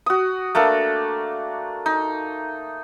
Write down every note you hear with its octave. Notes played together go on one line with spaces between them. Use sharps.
F#4 D#6
A3 A#3 D4 A4
D#4